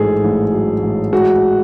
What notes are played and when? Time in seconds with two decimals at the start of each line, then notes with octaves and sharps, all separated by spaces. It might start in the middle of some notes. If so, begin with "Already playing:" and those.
Already playing: A1 G#2 F#3 G#4 A4
0.24 A1
0.53 F#3
0.83 A1
1.13 G#3 F#4